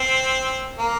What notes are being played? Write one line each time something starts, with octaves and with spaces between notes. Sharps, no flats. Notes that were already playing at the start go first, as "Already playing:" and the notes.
Already playing: C4
A#3